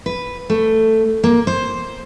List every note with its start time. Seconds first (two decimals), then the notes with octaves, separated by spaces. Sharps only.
0.06 B4
0.50 A3
1.24 A#3
1.47 C5